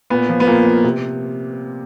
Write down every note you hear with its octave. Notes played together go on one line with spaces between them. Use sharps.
A#2 B3
F3
B3
A#2 A#3
F3
C3